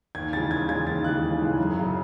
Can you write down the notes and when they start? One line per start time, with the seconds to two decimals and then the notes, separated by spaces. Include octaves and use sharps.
0.15 D#2 G#6
0.33 C#3 E3 G#3 A6
0.51 D#2 G#6
0.68 C#3 E3 G#3 G#6
0.86 D#2 A6
1.04 C#3 E3 G#3 F#6
1.22 D#2
1.40 C#3 E3 G#3
1.58 F#2
1.76 C#3 F#3